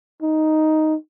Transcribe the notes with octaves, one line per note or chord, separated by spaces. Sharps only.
D#4